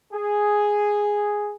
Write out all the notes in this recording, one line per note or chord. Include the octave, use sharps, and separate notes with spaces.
G#4